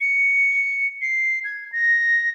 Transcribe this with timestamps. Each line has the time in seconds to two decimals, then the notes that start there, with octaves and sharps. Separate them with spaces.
0.01 C#7
1.02 C7
1.44 G#6
1.72 A#6